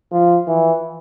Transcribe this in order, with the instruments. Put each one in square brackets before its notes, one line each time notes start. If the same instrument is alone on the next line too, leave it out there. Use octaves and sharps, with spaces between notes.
[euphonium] F3
E3